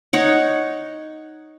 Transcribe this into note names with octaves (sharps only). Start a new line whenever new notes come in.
D#4 C#5 F#5